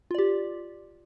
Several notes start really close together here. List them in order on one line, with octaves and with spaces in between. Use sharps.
F4 D5 G4